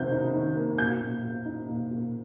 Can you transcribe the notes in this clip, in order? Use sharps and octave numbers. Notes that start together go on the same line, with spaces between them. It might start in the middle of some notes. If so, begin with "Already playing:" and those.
Already playing: C3 D#3 A#3 G6
D#4
D#3
A#3
A#2 G6
A#2
A#2
D#4
A#2
A#2